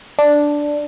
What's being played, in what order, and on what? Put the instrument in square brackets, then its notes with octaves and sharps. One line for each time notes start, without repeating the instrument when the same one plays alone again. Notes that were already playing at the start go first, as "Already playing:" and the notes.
[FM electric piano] D4